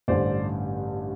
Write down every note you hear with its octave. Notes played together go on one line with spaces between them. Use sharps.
A1 G2 D3 C5 D5